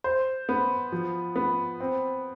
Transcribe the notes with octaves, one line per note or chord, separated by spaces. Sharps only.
C5
B3
F3
B3
C4